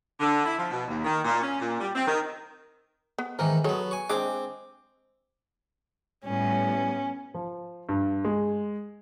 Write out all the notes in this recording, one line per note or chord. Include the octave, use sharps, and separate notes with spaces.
D3
E4
F3
B2
D#2
D#3
A#2
C#4
A#2
G3
C4
D#3
B3
G#2 D#3 E3 A#4
F#3 B3 G#4 A4 C#5
G#5 C#6
G#3 C4 D4 G#4 D6
A2 G3 B3 C#4
F3
G2
G#3